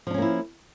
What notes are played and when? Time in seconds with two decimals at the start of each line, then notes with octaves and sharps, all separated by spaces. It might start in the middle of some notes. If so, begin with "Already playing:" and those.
0.07 F3
0.10 D4
0.14 C#4
0.18 A#3
0.22 E4